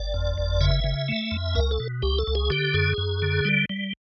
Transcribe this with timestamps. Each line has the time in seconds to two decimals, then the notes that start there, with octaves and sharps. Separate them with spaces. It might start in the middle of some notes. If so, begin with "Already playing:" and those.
Already playing: G1 D5
0.14 F2
0.38 G1
0.61 C#3 E5
0.84 C#3
1.08 A3
1.31 F2
1.55 C#2 A#4
1.71 A4
1.80 B2
2.02 C#2 G4
2.19 A4
2.27 C#2
2.35 G#4
2.50 D3 G4
2.74 F#2 G#4
2.98 F#2
3.22 D3
3.45 G3
3.70 G3